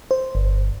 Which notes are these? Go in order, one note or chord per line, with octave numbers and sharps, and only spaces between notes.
C5
G1